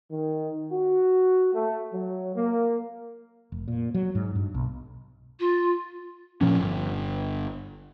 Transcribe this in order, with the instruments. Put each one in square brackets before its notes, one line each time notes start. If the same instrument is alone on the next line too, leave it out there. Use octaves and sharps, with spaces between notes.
[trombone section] D#3
F#4
A3
F#3
A#3
[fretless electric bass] F1
A#2
F#3
G#2
G2
B1
[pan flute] F4
[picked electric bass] A#2 F3 C#4
G1